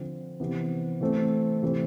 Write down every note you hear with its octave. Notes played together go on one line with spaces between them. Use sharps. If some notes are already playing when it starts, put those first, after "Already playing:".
Already playing: D3 F3 C4
C3 E3 B3
E3 A3 C4
C3 E3 A3 C4